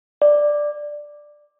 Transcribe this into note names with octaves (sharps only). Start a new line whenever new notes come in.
D5